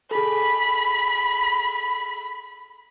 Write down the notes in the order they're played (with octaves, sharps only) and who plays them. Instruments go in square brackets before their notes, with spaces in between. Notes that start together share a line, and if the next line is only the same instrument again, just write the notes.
[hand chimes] G#4 A4 [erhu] B5